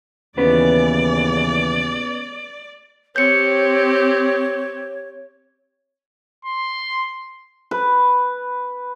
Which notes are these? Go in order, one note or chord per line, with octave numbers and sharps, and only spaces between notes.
D#2 C#3 E3 B3 C#4 B4 D5
C4 G4 C#5 G6 C#7
C6
B4